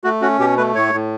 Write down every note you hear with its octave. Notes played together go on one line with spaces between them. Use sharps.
A3 F#4
C#4 F#4
B2 G4
A3 B4
A2 C#5
A2